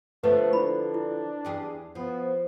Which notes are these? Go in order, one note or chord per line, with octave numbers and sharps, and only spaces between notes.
D3 F3 A3 B3 B4
D4 E4 B5
E4
E2 G4 G#4
F3 B3